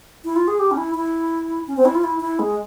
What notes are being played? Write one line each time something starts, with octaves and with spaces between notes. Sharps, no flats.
E4
F4
G#4
G4
C#4
E4
E4
C#4
C4
E4
F4
E4
E4
G#3